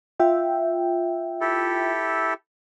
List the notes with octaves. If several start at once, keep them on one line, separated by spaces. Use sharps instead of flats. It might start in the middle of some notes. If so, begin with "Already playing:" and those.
F4 E5 G5
E4 G4 A4